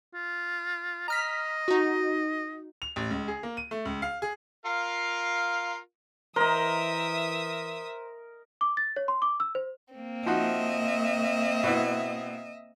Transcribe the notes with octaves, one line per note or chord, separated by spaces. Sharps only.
F4
D#5 A#5 F6 B6
D#4 F#4
F7
A1
C#2
G#4
A#3
D#7
A3
C#2
F5
G#4
F4 A#4 F5
E3 A#4 C5 D#5 E5 A#5 C6 D#6
D6
A6
C#5
C6
D6
E6
C5
A#3 C4
F3 D#4 F#4 D#5 E5
B2 B3 E4